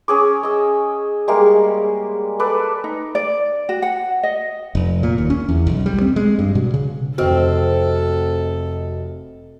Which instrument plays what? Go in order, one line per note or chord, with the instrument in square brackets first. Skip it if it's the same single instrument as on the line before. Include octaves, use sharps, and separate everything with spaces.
[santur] C#4 G#4 D6
D#5 E6
G3 G#3 A#3
A4 B4 D5
[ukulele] D#4
D5
F#4
F#5
D#5
[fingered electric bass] F1
A#2
D#2
C#4
E2
B1
G3
C4
G#3
G2
B2
C#3
[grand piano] F1 F6 [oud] C4 [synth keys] F#4 D#5 [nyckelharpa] A4